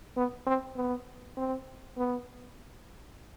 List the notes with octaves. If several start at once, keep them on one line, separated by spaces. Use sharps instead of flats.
B3
C4
B3
C4
B3